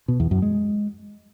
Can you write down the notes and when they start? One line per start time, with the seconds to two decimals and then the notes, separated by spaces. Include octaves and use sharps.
0.08 B2
0.20 E2
0.31 F#2
0.42 G#3